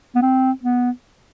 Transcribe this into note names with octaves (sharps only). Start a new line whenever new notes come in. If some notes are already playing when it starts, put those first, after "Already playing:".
B3
C4
B3